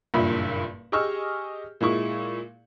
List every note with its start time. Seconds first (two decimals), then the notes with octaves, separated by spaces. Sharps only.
0.14 F#1 G2 A#2 E5 B5
0.92 G4 G#4 D#5 C#6 E6 F6
1.81 A#2 G#3 E4 C#6